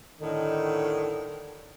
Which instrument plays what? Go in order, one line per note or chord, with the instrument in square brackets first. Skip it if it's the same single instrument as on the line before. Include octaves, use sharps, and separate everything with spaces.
[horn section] A2 D3 D#3